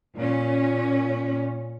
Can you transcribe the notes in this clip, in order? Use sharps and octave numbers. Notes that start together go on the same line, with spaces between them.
A#2 C#4